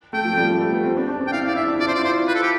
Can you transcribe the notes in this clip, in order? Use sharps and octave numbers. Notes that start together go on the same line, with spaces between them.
A3 G5
F3
A3
G3
A3
A3
B3
C4
D4
D4
D4
G5
E4 F5
E4
D5
E4 E5
D4
F4 D5
C5
D5
E4
F4 C5
B4
A4
G4